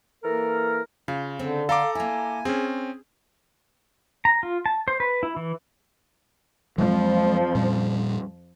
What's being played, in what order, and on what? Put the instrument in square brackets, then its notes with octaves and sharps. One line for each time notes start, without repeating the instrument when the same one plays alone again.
[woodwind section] E3 A#3 A4 A#4
[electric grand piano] C#3 [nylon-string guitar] F4
[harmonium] D3 [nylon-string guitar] C4
[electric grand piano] A4 A#5 D6 [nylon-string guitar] F5
[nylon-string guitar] A#3 E4 [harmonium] G#5
[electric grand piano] C4 C#4 [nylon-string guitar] G#4
[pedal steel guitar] A#5
F4
A5
C5
B4
E4
E3
[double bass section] F2 F3 [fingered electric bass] F#3 G#3
[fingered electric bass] A#2 G3